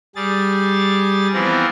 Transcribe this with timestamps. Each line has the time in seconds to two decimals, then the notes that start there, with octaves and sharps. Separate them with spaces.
0.16 G3 G#4 A6
1.34 E3 F3 B3 C4 A#4